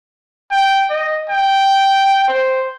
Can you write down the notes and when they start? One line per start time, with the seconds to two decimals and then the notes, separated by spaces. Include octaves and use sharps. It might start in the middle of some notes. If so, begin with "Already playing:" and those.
0.51 G5
0.90 D#5
1.30 G5
2.28 C5